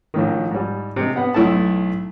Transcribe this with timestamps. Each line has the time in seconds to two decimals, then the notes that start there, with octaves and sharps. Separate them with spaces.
0.14 A#1 A2 D#3
0.51 G#2 G3
0.96 C3 G#3
1.16 B3 F#5
1.34 B1 A3 E4 A4 A5